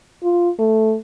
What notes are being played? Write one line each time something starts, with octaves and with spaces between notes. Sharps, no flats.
F4
A3